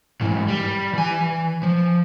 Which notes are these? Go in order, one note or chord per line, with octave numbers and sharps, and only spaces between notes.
G#2 E3
G3
E3 G#5
F3